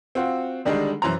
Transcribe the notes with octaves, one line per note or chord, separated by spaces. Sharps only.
C4 F4 F#4
D3 D#3 G3 G#3 D4 D#4
F#2 E3 F#3 C5 A#5